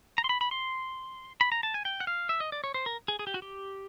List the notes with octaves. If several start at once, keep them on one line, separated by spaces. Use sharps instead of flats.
A#5
C6
B5
B5
C6
B5
A#5
A5
G#5
G5
F#5
F5
E5
D#5
D5
C#5
C5
A#4
G#4
G#4
G4
F#4
G4